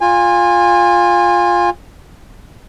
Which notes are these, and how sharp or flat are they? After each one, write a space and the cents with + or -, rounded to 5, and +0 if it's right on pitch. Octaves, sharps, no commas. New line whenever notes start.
F4 +10 G#5 -25